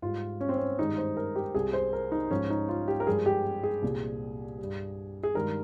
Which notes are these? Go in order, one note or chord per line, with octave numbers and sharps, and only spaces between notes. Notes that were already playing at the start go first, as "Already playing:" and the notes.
G#2 G3 F4
C#4
C4
C#4
G2 D#3 G#3 D#4
C5
A#4
G4
C2 C3 G3 G#4
C5
A#4
D#4
G#2 F3 G#3 C#4
D#4
F4
G4
A#4
G2 F3 G#3 G#4
G4
G#4
C2 A#2 G3
G2 G3
G#4
G2 D#3 G#3 A#4